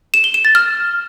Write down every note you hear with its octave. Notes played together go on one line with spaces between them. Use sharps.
E7
G7
E7
A6
F6